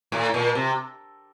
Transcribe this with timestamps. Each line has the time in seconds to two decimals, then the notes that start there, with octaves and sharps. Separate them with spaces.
0.12 A2
0.34 A#2
0.55 C3